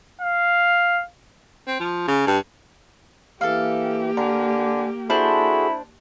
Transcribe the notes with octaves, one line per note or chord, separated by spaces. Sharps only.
F5
C4
F3
C#3
G2
E3 A#3 G4 A4 F5
D3 A#4 G#5
D4 E4 F#4 G#4 A4 C5